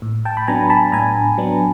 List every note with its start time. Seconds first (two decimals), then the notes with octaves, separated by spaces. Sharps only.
0.02 A2
0.25 G5 A5
0.37 B5
0.47 F#3 B3 D4 G#5 A#5
0.70 A5 B5
0.92 A2 G#5 A#5
1.37 F#3 B3 D4